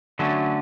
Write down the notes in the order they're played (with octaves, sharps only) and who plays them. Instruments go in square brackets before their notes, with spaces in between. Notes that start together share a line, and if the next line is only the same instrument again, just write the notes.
[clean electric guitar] D3 F#3 A3 C#4